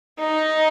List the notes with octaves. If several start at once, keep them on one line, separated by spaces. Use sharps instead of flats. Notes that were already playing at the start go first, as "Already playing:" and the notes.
D#4